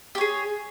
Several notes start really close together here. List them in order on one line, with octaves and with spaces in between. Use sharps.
G4 C#5 G#4